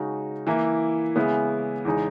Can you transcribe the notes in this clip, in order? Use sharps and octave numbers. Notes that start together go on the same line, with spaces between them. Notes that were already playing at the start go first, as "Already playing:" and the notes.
Already playing: C#3 G#3 D#4 F#4
E3 A#3 E4
C#3 G#3 B3 E4
E2 C#3 G#3 D#4